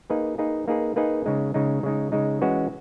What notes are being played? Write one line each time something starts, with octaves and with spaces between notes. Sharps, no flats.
A#3 D#4 G#4 B4
A#3 D#4 G#4 B4
A#3 D#4 G#4 B4
A#3 D#4 G#4 B4
C#3 G#3 D#4
C#3 G#3 D#4
C#3 G#3 D#4
C#3 G#3 D#4
E3 G#3 C#4 F#4 B4